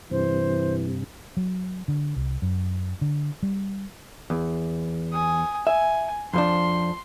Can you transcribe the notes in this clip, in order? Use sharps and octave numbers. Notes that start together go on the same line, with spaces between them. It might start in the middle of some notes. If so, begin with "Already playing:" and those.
G2 C3 E3 C5
F#3
D3
C2
F#2
D3
G3
E2
G#5 D#6
E5 G#5
F2 F3 D4 C6